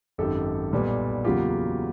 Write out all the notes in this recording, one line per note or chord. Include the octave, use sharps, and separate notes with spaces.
G#1 F#2 D#3 G4 A4
B1 A#2 G3 B3
E2 C#3 F#3 A#3 F4 G4